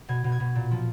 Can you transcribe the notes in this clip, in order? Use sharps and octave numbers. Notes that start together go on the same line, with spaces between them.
B2 G#6
B2
G#6
B2
A#2
F3